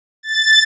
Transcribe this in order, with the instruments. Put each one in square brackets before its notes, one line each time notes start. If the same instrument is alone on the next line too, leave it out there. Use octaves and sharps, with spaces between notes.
[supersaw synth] A6